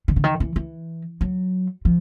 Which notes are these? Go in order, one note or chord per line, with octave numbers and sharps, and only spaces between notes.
D#3
D3
D#3
E3
E3
F#3
F3